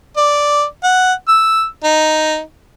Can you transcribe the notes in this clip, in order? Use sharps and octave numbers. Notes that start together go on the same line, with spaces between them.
D5
F#5
E6
D#4